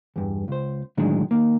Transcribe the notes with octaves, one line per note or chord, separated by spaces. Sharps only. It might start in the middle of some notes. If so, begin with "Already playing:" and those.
E2 G2
C#2 C5
A2 D3 D#3 F#3 G#3 D4
D#3 A#3